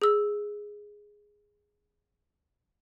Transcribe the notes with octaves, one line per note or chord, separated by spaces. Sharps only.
G#4 E6